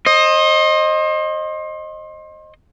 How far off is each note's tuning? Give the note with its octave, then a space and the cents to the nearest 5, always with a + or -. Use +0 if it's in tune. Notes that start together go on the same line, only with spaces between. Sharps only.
C5 +35 D#5 -5